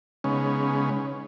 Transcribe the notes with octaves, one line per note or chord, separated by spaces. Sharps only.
C#3 G#3 B3 C#4 D#4